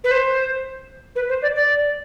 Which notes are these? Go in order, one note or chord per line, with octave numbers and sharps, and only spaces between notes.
B4
C5
B4
C5
D5
D5